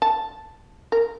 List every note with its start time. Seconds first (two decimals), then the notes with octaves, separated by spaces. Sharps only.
0.02 A5
0.92 A#4